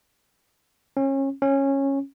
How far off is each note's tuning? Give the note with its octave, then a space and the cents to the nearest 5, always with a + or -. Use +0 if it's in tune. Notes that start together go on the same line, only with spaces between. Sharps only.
C#4 -30
C#4 -15